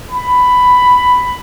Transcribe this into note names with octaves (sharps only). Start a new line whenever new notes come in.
B5